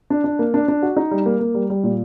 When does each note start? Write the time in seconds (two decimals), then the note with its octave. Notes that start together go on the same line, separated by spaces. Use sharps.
0.10 D4
0.24 D4
0.39 A#3
0.54 D4
0.68 D4
0.83 F#4
0.96 D#4
1.11 G3
1.26 A#3
1.40 A#3
1.54 G3
1.70 G3
1.84 A#2